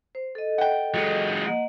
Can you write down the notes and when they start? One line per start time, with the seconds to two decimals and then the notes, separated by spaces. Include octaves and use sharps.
0.15 C5
0.35 A4 D#5
0.58 F#5 G5
0.94 F#3 G#3
1.46 A#3 D#5 F#5